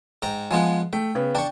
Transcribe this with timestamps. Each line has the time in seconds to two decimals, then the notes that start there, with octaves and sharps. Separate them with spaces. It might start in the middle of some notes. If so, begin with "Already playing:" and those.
0.22 G#2 G5 A#5
0.51 F3 G#3 B3 F4 G#5
0.93 A3 G5
1.15 C#3 B3
1.35 D4 G5 C#6